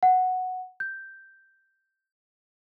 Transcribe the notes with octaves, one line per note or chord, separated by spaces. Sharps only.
F#5
G6